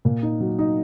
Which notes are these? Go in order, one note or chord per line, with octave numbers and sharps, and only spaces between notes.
A#2
D#4
F#3
D#4